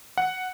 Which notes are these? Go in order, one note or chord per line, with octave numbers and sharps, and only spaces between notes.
F#5